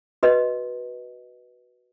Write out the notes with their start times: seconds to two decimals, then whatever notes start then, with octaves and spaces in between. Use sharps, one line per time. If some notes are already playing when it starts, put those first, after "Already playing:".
0.23 F#4 B4 D#5